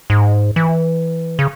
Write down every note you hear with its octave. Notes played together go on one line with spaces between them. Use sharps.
G#2
E3
C#3